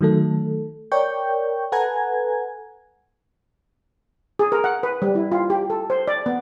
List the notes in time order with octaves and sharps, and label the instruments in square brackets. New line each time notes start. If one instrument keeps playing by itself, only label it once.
[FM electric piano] D#3 F#3 A3 A4
A#4 C#5 D5 G5 C#6 G6
A4 B4 F#5 G#5 A#5 G#6
[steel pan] G#4
A#4
F#5
B4
G3
E4
F4
G4
A4
C5
D5
B3